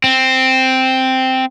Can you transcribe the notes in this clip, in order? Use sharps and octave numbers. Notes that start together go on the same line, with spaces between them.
C4